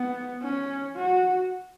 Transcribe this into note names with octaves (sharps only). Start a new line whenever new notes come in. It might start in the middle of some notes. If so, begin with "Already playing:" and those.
Already playing: B3
C#4
F#4